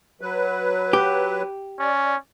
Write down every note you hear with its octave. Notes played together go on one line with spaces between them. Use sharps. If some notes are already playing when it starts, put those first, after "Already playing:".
F#3 B4
G4
C#4 D5